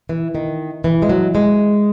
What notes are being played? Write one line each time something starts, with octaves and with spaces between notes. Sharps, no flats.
E3
D#3
E3
G#3
F#3
G#3